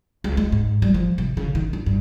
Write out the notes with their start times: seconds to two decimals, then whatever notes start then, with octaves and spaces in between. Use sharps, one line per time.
0.24 C#2
0.37 G#3
0.52 G#2
0.82 G3
0.94 F3
1.18 C3
1.37 C#3
1.55 D#3
1.73 D4
1.86 G2